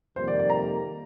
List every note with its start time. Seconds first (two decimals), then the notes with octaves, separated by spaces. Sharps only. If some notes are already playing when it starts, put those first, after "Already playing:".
0.16 F2 C3 D#3 G3 A#3 C5
0.28 D5
0.39 D5
0.50 A#5